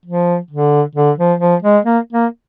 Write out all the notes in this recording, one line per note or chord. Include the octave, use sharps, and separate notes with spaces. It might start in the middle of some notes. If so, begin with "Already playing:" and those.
F3
D3
D3
F3
F3
G#3
A#3
A#3